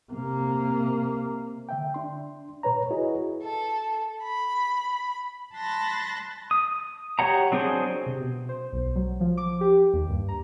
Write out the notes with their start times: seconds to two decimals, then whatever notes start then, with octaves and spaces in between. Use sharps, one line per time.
0.12 C3 A#3
1.69 D3 E5 G5
1.94 D4 C6
2.63 A#2 B4 C#5 A#5
2.91 E4 F#4 G#4 B4 C#5 D#5
3.42 A4
4.23 B5
5.54 A5 B5 C6 F#6 A6 A#6
6.51 D#6
7.19 F#4 G4 C#5 F#5 A#5
7.52 F#3 C4 D4 G#4 C5
8.06 C3
8.20 B2
8.49 C5
8.73 B1
8.96 F#3
9.20 F3
9.37 D6
9.61 G4
9.93 D#2
10.10 G2
10.28 A#5